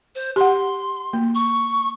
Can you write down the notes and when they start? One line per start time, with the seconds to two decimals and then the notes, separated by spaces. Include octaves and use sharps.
0.15 C5
0.36 G4 F#5 C6
1.13 A#3
1.35 C#6